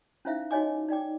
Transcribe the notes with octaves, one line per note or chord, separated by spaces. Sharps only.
C#4 D#4 E4 C5 E5 F5
D#4 F#4 C#5 D#5 G#5 D6
D#4 D5 G5 D6